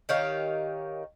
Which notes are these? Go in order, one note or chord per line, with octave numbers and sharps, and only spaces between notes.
D#3 G4 C#5 F5